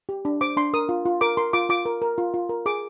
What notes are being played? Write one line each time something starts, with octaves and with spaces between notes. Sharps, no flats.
G4
D4
C5 D6
D4 C6
A#4 D#6
F4
F4
A#4 D6
A#4 C6
F4 D6
F4 D6
A#4
A#4
F4
F4
A#4
G#4 D6